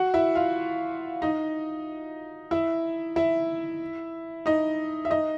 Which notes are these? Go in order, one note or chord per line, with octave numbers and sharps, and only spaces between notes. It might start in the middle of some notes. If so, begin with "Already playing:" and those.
Already playing: F#4 F#5
E4 E5
F4 F5
D#4 D#5
E4 E5
E4 E5
D#4 D#5
E5
D#4 D#5